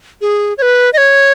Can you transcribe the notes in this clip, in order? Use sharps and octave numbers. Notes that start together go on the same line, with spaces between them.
G#4
C#5
B4
D#5
C#5